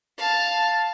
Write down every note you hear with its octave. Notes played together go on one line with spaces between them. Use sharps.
F5 A5